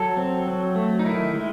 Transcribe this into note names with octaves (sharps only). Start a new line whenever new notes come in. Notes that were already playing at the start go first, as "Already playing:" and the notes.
Already playing: F#3 A4
C4
F#3
A3
D#4
D#3 E4
G#3